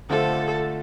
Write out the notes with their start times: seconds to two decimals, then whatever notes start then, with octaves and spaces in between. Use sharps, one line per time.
0.10 D3 A3 D4 F4 A4 C5